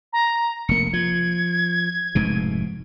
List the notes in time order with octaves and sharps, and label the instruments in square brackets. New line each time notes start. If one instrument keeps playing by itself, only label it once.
[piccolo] A#5
[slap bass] F1 A#3 [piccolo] C#7
[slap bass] F3 [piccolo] G#6
[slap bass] F1 G#2 B2